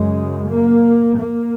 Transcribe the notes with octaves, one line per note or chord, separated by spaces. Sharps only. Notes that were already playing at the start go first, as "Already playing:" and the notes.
Already playing: F#2 C#3 G#3
A#3
A#3